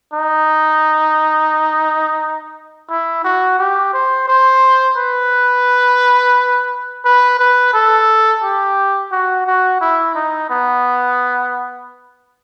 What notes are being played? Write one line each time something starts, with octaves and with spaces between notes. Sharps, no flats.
D#4
E4
F#4
G4
C5
C5
B4
B4
B4
A4
G4
F#4
F#4
E4
D#4
B3